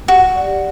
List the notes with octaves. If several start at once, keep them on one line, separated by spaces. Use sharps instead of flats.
F#4 G4
D5